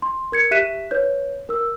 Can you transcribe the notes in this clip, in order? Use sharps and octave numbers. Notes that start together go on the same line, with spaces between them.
C6
A#4 G#6 C#7
G4 E5 F#6 B6 D#7 E7
B4 C#5 G6
A#4 E6